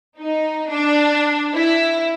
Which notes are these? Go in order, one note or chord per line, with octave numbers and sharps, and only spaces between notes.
D#4
D4
E4